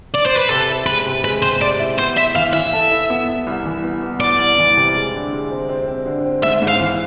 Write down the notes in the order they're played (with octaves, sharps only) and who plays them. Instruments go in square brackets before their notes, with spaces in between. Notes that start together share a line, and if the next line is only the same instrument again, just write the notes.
[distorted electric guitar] D5
C5
B4
[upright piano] C3 [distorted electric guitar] A4
[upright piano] E4
[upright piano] G#3 [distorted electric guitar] B4
[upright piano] C3
[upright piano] G#3 [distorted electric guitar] B4
[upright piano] C3 [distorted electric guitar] C5
[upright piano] C3 [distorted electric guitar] D5
[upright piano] E4
[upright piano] B3 [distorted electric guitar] C5
[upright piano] E4 [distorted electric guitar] E5
[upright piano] E3 [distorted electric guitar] F5
[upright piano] E3 [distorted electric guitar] E5
[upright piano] A4
E4
B3
E4
C2
E3
B3
B3
[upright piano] B3 [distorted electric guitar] D5
[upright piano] C2
E3
C3
G#3
D3
G#3
C4
C4
C4
D3
C4
[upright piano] G#2 [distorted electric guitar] E5
[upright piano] G#2
[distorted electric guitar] F5
[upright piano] E3